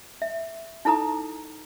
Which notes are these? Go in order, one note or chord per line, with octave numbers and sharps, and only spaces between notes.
E5
D#4 E4 A4 A#5 D#6